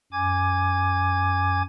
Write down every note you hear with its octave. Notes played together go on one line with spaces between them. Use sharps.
F#2 G#5 D6 G#6